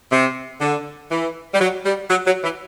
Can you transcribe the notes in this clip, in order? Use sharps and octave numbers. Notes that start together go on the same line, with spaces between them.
C3
D3
E3
G3
F#3
G3
F#3
F#3
E3